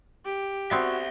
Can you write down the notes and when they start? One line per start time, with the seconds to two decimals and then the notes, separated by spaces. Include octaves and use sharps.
0.24 G4
0.71 B3 C4 F#4 D5 E5